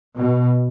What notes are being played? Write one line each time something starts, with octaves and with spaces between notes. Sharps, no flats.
B2